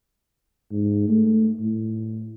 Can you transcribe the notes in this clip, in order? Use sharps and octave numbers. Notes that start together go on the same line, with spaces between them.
G#2
A3
A2